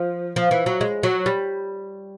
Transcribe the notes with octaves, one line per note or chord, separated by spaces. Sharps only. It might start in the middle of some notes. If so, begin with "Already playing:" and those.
Already playing: F3
F3
E3
F#3
G#3
F#3
G3